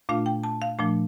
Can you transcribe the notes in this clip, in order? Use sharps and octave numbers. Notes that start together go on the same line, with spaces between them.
A#2 A3 D4 F4 F5
G5
A5
F5
A#2 F3 A3 D4